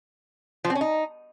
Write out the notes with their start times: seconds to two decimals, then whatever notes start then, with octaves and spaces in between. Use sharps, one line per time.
0.65 F3
0.70 C4
0.75 C#4
0.81 D#4